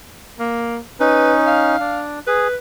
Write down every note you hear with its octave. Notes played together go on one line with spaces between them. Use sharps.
A#3
C#4 D#4 B4
F5
D4
G#4 B4